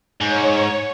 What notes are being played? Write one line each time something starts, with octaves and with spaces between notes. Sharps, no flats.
G#2 C#5